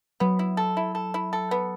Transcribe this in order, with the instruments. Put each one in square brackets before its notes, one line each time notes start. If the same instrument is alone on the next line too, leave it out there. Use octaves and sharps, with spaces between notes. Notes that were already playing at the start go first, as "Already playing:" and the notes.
[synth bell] F#3 [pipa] B3
[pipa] E4
A4
E4
A4
E4
A4
B3